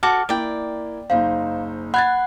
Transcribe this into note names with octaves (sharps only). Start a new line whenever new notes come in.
F#4 A4 D6 F6
A#3 E4 D5 G5
F#1 D#4 C5 F5
F#5 B5 F#6 G#6 A6